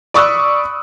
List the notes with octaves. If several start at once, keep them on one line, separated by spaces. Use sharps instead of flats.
D5 B5 C#6 D#6 E6 F#6